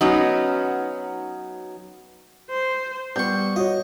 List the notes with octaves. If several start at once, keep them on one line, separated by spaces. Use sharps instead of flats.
F#3 B3 C#4 D#4 F#4
C5
G3 B3 C#6 G6
F#4 C#5 D#5